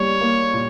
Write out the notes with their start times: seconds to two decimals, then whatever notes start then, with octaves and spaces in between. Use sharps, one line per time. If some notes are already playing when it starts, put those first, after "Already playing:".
Already playing: G3 A#3 C#5
0.21 A#3
0.54 A#2